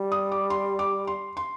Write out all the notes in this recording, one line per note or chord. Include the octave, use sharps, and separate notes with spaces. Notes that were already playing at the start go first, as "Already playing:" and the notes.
Already playing: G3
D#6
D6
C6
D6
C6
C6